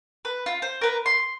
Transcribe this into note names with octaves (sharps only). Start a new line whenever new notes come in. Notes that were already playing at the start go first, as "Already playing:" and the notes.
B4
F4
C5
A#4 B4
C6